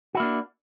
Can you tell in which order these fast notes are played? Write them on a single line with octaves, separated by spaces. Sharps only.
F#4 E4 A#3 D4